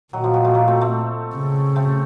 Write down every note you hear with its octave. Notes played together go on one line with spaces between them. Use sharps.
A#2 D#3 F#3
F3
D#3 F#3
F3 A3
F#3 A#3
A3 C4
A3 C4
C#3
A3 C4